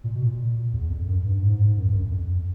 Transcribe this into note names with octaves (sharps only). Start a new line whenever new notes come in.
A#2
B2
A#2
E2
F2
F#2
G2
G#2
G#2
F#2
G2
F#2
F2